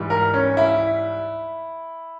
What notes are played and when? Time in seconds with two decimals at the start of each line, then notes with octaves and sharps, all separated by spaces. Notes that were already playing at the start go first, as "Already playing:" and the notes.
Already playing: G#2 E3 G3
0.10 A#4
0.34 C#4
0.57 E4